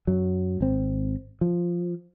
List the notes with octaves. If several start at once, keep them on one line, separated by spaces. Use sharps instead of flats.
F#2 F#3
G#1 C4
F3